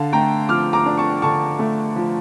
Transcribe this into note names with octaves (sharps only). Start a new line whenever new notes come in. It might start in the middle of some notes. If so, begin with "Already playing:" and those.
Already playing: D3 F5 A5
A3 G5 A#5
F3 D6 F6
A#5 D6
D4
A5 C#6
D3 A5 C#6
A3
F3